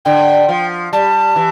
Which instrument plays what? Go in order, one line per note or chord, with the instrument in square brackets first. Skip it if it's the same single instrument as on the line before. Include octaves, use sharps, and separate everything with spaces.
[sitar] D3 [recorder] G5
[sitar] F3
[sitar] G3 [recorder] A5
[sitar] E3